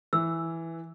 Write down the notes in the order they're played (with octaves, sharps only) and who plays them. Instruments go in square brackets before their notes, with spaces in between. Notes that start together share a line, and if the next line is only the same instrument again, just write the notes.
[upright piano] E3 [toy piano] E6